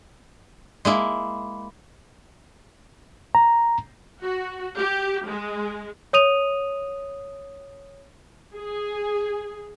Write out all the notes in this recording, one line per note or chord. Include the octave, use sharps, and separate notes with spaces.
G#3 A#3 E4
A#5
F#4
G4
G#3
C#5 D#6 D#7 F7
G#4